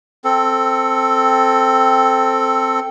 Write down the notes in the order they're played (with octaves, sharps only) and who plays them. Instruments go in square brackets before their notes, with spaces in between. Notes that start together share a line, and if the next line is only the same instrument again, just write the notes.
[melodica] C4 A4